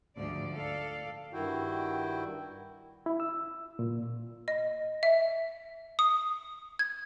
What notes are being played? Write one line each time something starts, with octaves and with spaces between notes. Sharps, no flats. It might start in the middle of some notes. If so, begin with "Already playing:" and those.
D2 G#2 F3 D5
A4 D5 F5
G2 D#3 E4 F#4 G5
E4
E6
A#2
D#5
E5
D#6
G#6